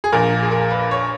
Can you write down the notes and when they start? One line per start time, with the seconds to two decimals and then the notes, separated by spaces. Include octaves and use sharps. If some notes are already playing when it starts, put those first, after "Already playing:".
0.04 G#4
0.12 A#1 A#2 A#4
0.43 G#4
0.51 A#4
0.70 B4
0.91 C#5